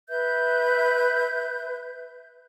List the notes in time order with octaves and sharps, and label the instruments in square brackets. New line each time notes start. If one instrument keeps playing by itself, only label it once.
[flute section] B4 E5 G6